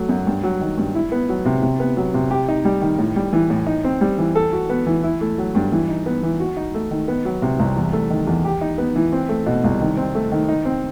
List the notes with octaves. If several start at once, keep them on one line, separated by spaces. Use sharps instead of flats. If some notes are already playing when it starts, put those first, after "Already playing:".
Already playing: F#3 A3
F#2
G2
F#3
D#3
G2
E4
B3
F#3
C3
C3
B3
F#3
C3
G4
D#4
G3
D#3
A2
G3
E3
A2
D#4
C4
G3
E3
A4
F#4
B3
E3
E4
A3
F#3
G2
E3
D#4
B3
E3
F#4
D#4
A3
D#3
B3
F#3
C3
C2
E2
A3
D#3
E2
G4
D#4
B3
E3
C4
A3
B2
C2
D#3
C4
A3
D#3
D#4
C4